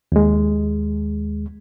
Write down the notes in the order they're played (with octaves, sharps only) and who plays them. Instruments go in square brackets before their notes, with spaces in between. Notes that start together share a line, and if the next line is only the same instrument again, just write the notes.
[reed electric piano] D#2 G#3